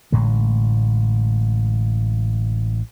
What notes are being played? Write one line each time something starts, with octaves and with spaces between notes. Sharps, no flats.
A1 A2 D3 G#3